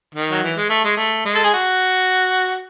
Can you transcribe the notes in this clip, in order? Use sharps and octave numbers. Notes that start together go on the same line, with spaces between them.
D#3
F#3
E3
G#3
A3
G#3
A3
G#3
A4
G#4
F#4